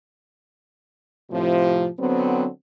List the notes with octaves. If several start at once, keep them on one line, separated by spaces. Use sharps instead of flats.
A2 C3 F3
D3 F#3 B3 C4